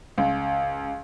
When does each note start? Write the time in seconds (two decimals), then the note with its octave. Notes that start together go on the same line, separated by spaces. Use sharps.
0.18 C#2